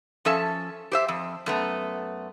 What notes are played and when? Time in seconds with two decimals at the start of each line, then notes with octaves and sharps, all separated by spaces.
0.25 F3 C#4 A4 E5 A5
0.92 G4 C5 E5
1.08 F2
1.46 F#2 A3 B3